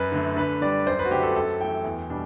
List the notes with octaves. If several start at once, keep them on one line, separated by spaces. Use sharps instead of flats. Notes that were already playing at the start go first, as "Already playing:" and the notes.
Already playing: F#2 B4
D3 A3
D3 B4
G3 D4 D5
F#2 C5
B4
F#4
D3 A3 D4 G4
A4
F#2 A4
E3 A3 G5
E2
B2 G3 D4